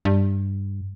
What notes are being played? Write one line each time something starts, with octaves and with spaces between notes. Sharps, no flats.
G2